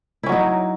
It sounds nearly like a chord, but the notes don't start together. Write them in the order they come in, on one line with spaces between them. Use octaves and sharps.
E4 C#4 F#3 D#4